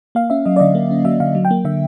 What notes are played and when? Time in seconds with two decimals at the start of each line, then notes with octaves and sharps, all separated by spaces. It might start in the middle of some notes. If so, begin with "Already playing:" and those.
0.15 A#3 F5
0.30 C#4 E5
0.46 F#3 D#5
0.56 D5
0.60 D3 D#5
0.75 A#3
0.91 C#4
1.05 F#3 E5
1.20 D3 F5
1.35 F#3
1.45 G5
1.51 A#3
1.65 D3 E5